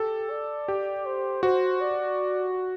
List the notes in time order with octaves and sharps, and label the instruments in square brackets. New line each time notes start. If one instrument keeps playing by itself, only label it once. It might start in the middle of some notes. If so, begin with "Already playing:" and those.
Already playing: [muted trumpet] G4 [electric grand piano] A4
[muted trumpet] D5
[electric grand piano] G4
[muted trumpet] C5
[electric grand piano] F#4 [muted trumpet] C5
[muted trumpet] D5